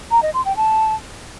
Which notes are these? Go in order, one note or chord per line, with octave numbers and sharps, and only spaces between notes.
A#5
D#5
C6
G5
A5